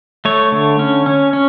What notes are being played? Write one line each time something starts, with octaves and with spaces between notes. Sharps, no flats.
A3 C#5
D3
C#4
C#4
C#4